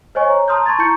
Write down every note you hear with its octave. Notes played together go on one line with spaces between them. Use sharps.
C5 C#5 D#5 G#5 C#6
C#5 A#5
A5 A#5 C6 D#6 F6 G6
A5 C6 C#6 G#6 A6
E4 A5 A#5 C#6 G6 C#7